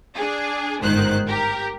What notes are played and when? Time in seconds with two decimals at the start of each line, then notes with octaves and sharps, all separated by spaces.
0.15 D4 G#4
0.82 G1 G#2 D#3 C5 F#6
1.26 G4 A#4